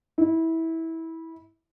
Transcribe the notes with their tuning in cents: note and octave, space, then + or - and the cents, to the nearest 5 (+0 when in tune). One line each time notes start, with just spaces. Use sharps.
E4 -20